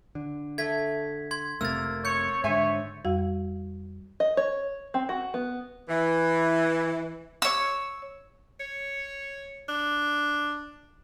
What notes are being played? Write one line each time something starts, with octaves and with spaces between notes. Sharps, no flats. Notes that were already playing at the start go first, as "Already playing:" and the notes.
D3
A3 G#6 B6
C6 G#6
F1 C3 A3 A#3 E6 A6
C#5 G6 C#7
G#2 D3 C#5 E5 G#5
F2 G3 F#4 F5
D#5
C#5
C4
F#4
B3
E3
C#5 E6
C#5
D4